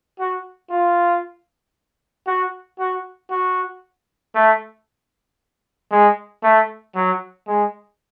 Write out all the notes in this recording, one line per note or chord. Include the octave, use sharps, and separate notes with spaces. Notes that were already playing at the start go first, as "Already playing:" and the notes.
F#4
F4
F#4
F#4
F#4
A3
G#3
A3
F#3
G#3